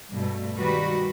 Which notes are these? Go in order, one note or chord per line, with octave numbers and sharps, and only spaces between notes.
G2 B2 A3
D#3 G3 F#4 B4